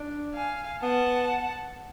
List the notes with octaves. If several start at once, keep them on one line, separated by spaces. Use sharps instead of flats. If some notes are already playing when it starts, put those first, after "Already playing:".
Already playing: D4
F5 G#5
B3 F#5 A5